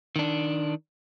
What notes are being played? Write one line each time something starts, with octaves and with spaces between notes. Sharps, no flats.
D#3 D4